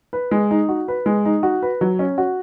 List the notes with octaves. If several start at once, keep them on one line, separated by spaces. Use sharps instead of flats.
B4
G#3
D#4
F#4
B4
G#3
D#4
F#4
B4
F#3
C#4
F#4